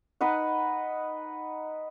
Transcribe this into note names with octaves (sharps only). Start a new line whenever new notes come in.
D#4 B4 D#5 F#5